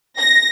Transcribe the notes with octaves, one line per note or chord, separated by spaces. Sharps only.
A#6